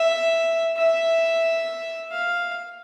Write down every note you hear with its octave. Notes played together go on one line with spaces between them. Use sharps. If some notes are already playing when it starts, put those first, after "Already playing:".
Already playing: E5
E5
F5